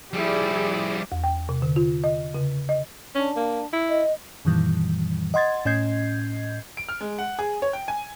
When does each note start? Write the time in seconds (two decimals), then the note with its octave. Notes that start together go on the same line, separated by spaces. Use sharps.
0.13 F3 G3 E4 G4 G#4 D5
1.12 E2
1.24 G5
1.49 C3
1.62 D3
1.76 F4
2.04 D#5
2.34 C#3
2.69 D#5
3.15 C#4 D4
3.37 A#3
3.73 E4
3.89 D#5
4.45 F#2 A#2 D#3 E3 G3
5.34 D#5 F#5 C6 G#6 A6
5.65 A2 C#4 D#5 G6 G#6 C7
6.77 D7
6.89 F6
7.01 G#3
7.19 F#5
7.39 G#4
7.62 C#5
7.73 G5
7.88 G#5